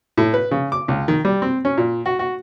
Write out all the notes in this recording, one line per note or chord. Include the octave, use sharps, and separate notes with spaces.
A2
B4
C#3
D6
C#2
D#3
G3
C4
C#4
A#2
F#4
F#4